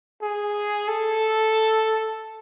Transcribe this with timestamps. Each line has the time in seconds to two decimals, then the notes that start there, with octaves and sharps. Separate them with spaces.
0.22 G#4
0.88 A4